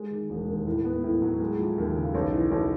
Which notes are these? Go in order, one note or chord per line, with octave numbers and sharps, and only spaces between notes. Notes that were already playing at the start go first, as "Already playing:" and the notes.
Already playing: G#3
D#3
E1
D#2
A2
B3
A2
F#3
G#3
F3
D#2
C#3
B1
E3
B1